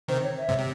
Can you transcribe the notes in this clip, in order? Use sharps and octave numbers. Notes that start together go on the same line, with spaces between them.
C3 D#3 C5
C#5
E5
G#2 C3
C3